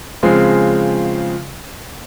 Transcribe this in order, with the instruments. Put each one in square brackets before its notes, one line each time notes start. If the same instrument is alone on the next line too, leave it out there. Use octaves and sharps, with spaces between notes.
[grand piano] C#3 F3 G#3 C4